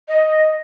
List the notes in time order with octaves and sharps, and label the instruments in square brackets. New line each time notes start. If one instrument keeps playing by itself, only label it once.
[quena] D#5